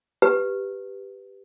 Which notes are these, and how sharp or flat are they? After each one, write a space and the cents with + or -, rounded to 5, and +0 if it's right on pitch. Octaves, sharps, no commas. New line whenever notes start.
G4 +0 B4 +0